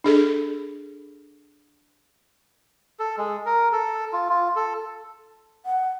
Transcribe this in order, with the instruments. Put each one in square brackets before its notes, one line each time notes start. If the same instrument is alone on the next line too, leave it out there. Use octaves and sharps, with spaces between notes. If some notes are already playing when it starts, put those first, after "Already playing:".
[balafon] D4 G#4 A4
[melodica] A4
G#3
A#4
A4
F4
F4
A4
[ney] F#5